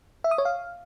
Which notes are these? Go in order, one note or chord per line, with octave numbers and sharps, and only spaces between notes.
E5
D#6
C#5
F5